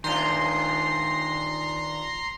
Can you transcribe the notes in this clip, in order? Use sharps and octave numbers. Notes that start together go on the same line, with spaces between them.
D#3 D4 F4 A#5 C6